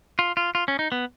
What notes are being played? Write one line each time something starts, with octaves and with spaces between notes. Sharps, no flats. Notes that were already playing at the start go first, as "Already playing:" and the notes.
F4
F4
F4
C#4
D#4
B3